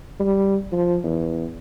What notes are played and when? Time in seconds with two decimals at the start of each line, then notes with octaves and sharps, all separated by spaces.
0.20 G3
0.73 F3
1.04 E2